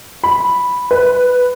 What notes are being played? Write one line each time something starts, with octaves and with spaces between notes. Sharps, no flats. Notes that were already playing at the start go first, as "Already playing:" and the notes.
B5
B4